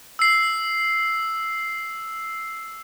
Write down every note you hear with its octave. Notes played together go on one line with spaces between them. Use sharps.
E6 C7